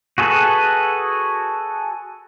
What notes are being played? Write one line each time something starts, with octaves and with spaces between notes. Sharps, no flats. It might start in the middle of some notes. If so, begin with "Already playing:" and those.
F#4 G#4 A4 B4